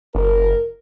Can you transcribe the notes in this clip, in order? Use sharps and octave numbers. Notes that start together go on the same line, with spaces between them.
F#1 A#4